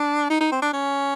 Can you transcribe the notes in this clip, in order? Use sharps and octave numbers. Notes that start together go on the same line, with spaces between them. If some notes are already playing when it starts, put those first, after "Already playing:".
Already playing: D4
D#4
D#4
C4
D4
C#4